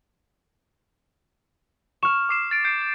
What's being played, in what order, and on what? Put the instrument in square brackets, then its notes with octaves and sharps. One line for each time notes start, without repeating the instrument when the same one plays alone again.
[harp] C#6 F6 [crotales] E7
[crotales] D6 C7 E7
A6 D7
G6 C7 D7
G6